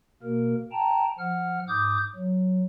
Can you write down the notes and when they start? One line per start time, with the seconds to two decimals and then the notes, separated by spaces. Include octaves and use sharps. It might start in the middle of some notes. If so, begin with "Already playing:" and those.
0.23 B2 A#3 A#4
0.72 G5 A5 A#5
1.19 F3 F#5 F6
1.68 G#2 D6 D#6 G6
2.15 F#3